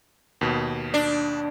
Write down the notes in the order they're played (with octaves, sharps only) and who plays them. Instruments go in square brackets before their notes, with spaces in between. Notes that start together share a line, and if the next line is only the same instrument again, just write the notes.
[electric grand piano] D#2 B2
[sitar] D4